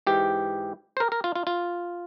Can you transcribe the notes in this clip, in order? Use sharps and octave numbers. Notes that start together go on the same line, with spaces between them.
G#2 E3 G4
C5
A#4
A#4
F4
F4
F4